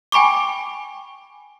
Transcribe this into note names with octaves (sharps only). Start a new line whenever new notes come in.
G5 G#5 B5 C#6 D6